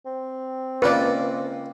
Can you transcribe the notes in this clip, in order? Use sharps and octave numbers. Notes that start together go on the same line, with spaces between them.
C4
C#2 A#3 B4 D5 A5